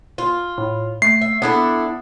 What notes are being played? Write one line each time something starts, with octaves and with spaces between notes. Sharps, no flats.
F4
A2
A3 C7
E5
B3 D4 E4 A4